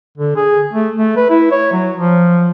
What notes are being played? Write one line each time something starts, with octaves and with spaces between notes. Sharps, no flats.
D3
G#4
A3
A3
B4
E4
C#5
F#3
F3